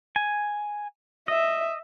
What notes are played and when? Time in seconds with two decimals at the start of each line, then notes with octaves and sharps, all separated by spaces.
0.16 G#5
1.28 D#5 E5